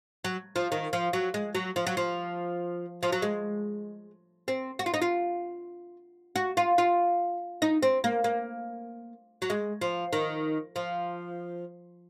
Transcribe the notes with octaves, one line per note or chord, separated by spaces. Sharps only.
F#3
F3
D#3
F3
F#3
G#3
F#3
F3
F#3
F3
F3
F#3
G#3
C4
F#4
F4
D#4
F4
F#4
F4
F4
D#4
C4
A#3
A#3
F#3
G#3
F3
D#3
F3